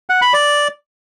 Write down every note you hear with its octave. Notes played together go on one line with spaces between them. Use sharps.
F#5
B5
D5